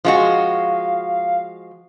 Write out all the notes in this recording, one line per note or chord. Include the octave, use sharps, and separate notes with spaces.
F3 G#3 F#4 F5